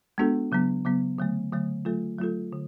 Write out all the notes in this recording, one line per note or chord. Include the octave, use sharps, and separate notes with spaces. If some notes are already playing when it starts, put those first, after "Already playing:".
G#3 B3 D4 F#4 A4
C#3 F#3 B3
C#3 F#3 B3
D3 F#3 A3
D3 F#3 A3
F#3 A3 F4 A4
F#3 A3 F4 A4
D3